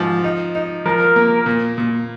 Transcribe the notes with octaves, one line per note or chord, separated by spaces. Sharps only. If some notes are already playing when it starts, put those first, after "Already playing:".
Already playing: G#2 F3
D#4
D#4
F3 A#4
A#3
A#2
A#2